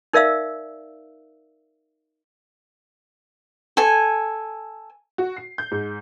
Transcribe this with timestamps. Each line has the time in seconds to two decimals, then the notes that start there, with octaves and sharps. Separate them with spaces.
0.13 D#4 A#4 D5 E5 F5 E6
3.77 A4 G#5
5.18 F#4
5.36 C7
5.58 G6
5.71 G#2